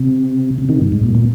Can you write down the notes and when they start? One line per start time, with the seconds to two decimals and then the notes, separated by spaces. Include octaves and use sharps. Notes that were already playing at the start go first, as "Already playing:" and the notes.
Already playing: C3
0.58 C3
0.69 C3 D#3
0.81 G2
0.92 G#2
1.03 A#2
1.15 A#2